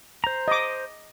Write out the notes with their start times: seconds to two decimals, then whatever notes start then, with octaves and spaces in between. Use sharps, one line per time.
0.24 C5 A#5
0.48 D#5 D6